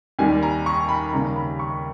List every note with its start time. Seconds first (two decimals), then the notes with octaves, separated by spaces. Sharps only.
0.19 D#2 D#3 G3 G#5
0.43 A#5
0.66 C#6
0.89 B5
1.13 D#2 C#3 G3 A#5
1.36 B5
1.59 C#6